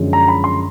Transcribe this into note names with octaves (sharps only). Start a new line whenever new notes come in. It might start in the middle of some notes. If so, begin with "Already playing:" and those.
Already playing: F#2 D3 F3 G#3
A#5
B5
C6